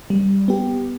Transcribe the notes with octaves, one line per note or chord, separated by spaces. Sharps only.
G3
B3 G4